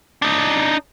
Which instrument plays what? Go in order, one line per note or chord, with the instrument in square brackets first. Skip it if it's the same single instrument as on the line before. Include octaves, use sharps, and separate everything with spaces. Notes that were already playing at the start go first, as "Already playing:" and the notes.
[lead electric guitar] D4 D#4